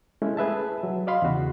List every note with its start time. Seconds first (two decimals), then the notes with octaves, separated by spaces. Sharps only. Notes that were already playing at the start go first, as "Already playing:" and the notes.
0.22 G#3 A3 C#4 E4
0.37 G#4 B4 E5 A5
0.83 F#3
1.07 D5 D#5 F5 B5 C6
1.22 E2 C#3 F#4